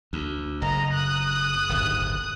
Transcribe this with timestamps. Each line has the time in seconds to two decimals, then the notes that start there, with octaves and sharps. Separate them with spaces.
0.13 D2
0.62 F#1 D#5 A#5
0.92 D#6 F#6
1.69 D1 G1 D#2